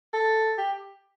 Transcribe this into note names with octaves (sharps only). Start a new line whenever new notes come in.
A4
G4